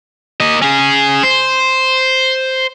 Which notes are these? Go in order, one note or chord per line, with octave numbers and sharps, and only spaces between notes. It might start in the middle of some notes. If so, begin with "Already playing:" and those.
A#3 D#5
C#4 G#4
C5